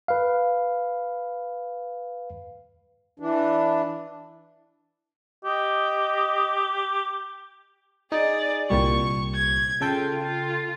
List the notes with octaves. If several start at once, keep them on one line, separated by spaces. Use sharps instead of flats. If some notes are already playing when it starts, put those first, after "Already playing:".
B4 F5
E3 D4
G4 D#5
D#4 G#4 D5
C2 A#2 G3 C#6
G#6
C#3 F4 A4 G5
F4